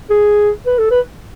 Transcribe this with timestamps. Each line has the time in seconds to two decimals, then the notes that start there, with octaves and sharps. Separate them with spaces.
0.10 G#4
0.66 B4
0.78 A4
0.91 B4